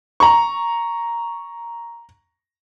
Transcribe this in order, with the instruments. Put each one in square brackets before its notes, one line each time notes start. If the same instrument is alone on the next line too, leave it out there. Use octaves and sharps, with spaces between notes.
[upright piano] A#5 C#6